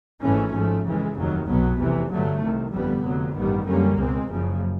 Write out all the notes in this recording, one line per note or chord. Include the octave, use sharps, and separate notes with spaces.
G#1 G#2 E3 A3 C#4
G#2 F3 A3
F2 C#3 E3 G#3
F1 D#2 D#3 F#3
B1 B2 F#3 B3
F1 E2 C3 E3
G2 D3 F#3 A3
C2 C3 D#3
G1 F2 D3 G3 B3
F1 F2 D3 F#3
A1 G2 D#3 G3 B3
F#2 D3 G3 A#3 C#4
C#2 B2 G#3 C4
F#1 F#2 C#3 F3